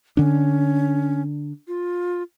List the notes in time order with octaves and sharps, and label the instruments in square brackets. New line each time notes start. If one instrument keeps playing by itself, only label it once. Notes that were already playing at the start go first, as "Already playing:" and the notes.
[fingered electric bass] D3 D4 [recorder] C#4
[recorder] F4